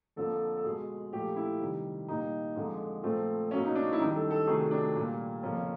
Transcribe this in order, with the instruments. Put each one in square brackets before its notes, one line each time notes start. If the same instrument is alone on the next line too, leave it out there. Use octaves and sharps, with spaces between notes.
[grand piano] F2 D3 F3 A#3 A4
A4
B2 G#3 G#4
A#2 F3 A3 G4
E4
C3 D#3 G3
A#2 G3 A#3 D#4
F2 D3 F3 G#3
A#2 F3 A3 C4
B2 F#3 A#3 C#4
D#4
D4
E4
F#2 D#3 G3 D#4
A4
A4
C3 D#3 F#3 A3 G#4
D4
A#2 G3 A#3
F2 C#3 F3 A#3 C#4